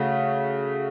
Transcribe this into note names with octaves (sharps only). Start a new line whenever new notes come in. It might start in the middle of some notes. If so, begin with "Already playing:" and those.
Already playing: C#3 A3 F#4